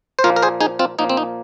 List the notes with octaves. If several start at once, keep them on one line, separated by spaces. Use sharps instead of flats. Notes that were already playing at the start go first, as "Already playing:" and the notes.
C5
A#2 F3 A#3 F4 A#4
A#4
G#4 C5
D#4 G#4
C4 F4
A#2 F3 A#3 D#4
C4
D#4